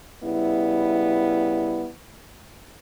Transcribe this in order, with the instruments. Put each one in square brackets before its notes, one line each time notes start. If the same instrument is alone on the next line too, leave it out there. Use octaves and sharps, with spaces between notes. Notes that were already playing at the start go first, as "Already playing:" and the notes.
[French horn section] C#3 G3 B3 E4